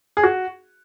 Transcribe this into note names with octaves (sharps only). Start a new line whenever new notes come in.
G#4
F#4